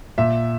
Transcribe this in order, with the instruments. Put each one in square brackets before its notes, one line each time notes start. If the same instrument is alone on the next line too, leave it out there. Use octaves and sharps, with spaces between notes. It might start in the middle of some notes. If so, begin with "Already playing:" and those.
[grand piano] A#2 E5